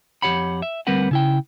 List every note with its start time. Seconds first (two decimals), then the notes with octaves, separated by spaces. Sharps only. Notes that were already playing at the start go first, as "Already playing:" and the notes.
0.22 F2 G3 G4 C#5 F#5 B5
0.62 E5
0.87 D2 G3 C4 A#4 B4 F#5
1.11 C#3 E4 G5